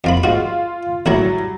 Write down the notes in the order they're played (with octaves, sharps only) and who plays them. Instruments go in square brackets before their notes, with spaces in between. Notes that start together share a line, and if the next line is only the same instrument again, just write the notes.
[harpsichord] F2 F4 B5
[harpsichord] G#2 F#4 [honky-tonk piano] F4
[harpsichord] A1 E4 C#5 [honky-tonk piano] F#3 G3